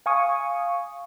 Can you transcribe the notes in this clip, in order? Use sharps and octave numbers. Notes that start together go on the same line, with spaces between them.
F5 G#5 C#6 D#6